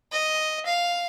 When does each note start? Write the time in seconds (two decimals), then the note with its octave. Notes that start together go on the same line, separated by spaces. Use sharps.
0.13 D#5
0.66 F5